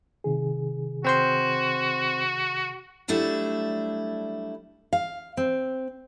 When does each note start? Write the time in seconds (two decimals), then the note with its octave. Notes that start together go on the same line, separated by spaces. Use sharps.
0.24 C3 D#3 G#4
1.05 C4 F#4 C5 C6
3.08 F#3 G3 A3 D4 E4
4.93 F5
5.37 C4